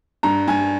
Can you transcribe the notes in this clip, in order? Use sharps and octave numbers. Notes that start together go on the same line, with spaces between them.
G2 A#5
G2 G#5